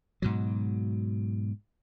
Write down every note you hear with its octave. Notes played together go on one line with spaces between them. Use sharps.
G#2 B2 F#3